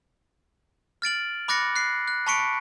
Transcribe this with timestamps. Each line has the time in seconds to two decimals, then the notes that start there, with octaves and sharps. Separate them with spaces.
1.02 F6 A6 D7 F#7
1.48 B5 D6 F#6 A6 A#6 C#7
1.76 F#6 C7
2.08 F#6
2.27 A5 B5 C#6 B6 C#7 D7